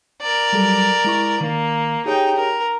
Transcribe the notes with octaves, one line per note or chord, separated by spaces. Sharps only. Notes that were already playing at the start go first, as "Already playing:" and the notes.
A#4 D5
F#3 G3 A4
G#3 E4 C#6
D#3 A#3
D#4 G4 G#4 C#5 G5
A#4